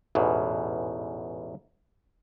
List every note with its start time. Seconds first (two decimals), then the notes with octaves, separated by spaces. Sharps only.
0.15 A1 E2 G#2 B2